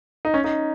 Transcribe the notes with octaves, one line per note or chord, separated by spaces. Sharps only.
D#4
C#4
D#4